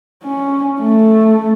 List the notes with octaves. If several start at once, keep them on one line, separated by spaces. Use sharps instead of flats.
C#4
A3